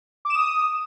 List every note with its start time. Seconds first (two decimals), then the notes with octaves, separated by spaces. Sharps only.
0.25 D6
0.30 E7
0.35 D#6